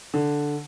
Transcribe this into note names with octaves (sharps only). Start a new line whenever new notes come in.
D3